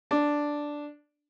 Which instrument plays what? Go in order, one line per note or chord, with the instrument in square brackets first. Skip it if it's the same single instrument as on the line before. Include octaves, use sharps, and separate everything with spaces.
[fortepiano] D4